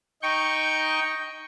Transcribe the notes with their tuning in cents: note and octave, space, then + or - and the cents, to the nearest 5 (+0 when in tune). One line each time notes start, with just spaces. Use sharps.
D#4 +0 G5 +0 C#6 +0